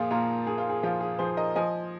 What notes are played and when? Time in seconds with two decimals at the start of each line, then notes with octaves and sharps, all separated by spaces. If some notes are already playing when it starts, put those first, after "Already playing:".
Already playing: A#2 F3 F4 G#4
0.11 A#2 F4 A#4
0.47 A#2 G#4
0.58 F4
0.70 G#4
0.83 F3 F4
1.01 G#4
1.19 F3 G#4 C5
1.37 A#4 D#5
1.56 F3 D#5 G#5